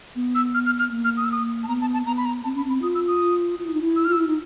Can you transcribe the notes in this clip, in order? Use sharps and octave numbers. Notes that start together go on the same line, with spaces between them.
B3
E6
F6
F6
F6
A#3
F6
D#6
E6
D#6
A5
B3 A#5
A5
A5
B3 A#5
B5
A#5
C4 A5
C#4 B5
C4 B5
F4 D#6
E6
D#6
F4
E4
D#4
E4
E6
F6
F4
E6
E4
D#4